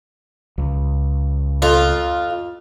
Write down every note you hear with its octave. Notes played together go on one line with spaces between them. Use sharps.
C#2
F2 F4